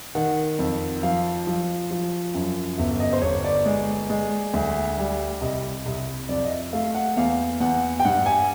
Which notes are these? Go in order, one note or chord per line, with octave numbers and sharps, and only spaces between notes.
D#3 F#5
F2
F3 F5
F3
F3
F#2
G1 E5
D#5
C5
G1 C#5
D5
G#3
G#3
D2
G3
C2 D#5
C2
F2 D5
D#5
E5
A3 F5
F#5
E2 F5
E2 F#5
G5
G2 F#5
G#5